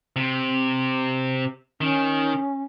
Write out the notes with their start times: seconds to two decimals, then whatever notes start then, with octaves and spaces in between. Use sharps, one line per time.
0.16 C3
1.81 D#3 C#4